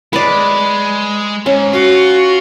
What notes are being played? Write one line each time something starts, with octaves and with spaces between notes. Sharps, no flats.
G#3 B4 D5
G#2 C#4
F4 F#4